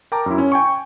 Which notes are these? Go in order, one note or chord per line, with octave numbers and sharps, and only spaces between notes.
A#4 G5 A5 A#5 D6
F#2 E4
C#4
G5 G#5 C#6